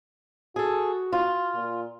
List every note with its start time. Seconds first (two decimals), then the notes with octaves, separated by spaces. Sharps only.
0.56 F#4 G#4 A4
1.13 F4
1.55 A#2